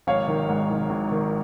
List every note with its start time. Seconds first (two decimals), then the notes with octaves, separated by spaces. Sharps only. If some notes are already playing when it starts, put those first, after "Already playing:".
0.07 G#1 C#5 F5
0.28 D#3
0.49 G#2
0.70 D#3
0.90 G#1
1.12 D#3